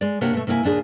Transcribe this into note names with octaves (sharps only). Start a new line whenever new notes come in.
G#3 D5
C3 A#3 D4 G4 C#5 F#5
B2 A3
C3 A#3 E4 D#5 G#5
D#2 A#2 D4 G#4